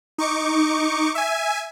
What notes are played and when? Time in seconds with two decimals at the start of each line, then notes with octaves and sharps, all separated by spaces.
0.18 D#4 C#6 D6 C#7
1.15 E5 G#5